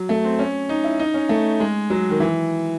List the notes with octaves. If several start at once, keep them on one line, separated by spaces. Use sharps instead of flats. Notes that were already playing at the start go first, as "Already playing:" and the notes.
Already playing: F#3
A3
C4
C#4
D#4
E4
D#4
C#4
A3
G#3
F#3
D#3
E3